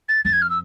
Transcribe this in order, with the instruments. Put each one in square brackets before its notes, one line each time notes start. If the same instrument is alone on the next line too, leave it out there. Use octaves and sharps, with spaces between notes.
[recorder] A6
[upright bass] F2 [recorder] A6
[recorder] G#6
F6
E6